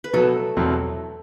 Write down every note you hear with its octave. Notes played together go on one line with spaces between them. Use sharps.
B4
B2 F#3 A3 B3 F#4 A4
E2 B2 F#3 C4 E4